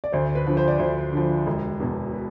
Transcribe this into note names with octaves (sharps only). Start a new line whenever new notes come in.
D5
D2 C5
B4
D3 F3
C5
D5
D2 C5
D3 F3
E1
E2 B2
B4